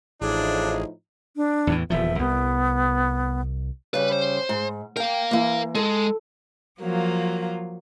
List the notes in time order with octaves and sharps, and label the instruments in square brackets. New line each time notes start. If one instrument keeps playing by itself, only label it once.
[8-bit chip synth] A1 [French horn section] A2 F3 D#4 [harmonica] D4 [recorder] G#4
[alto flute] D4
[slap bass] E2 A2 E3
[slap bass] D#1 E2 F3 [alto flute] E5
[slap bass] C2 [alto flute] B3
[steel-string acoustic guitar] C#3 G3 [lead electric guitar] B4
[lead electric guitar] C5
[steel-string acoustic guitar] G#2
[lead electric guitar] A#4 F5 [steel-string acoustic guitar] G5
[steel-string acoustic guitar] E3 A#3
[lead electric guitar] G#3 [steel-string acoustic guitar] A4
[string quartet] F3 F#3 A#3 F4